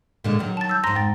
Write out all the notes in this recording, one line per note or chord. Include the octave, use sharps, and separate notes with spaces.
A#2 D3 G#3
D#3 F#3
A5 A6
E6 G6
F2 G#2 A#5 C6 A#6
G5 A6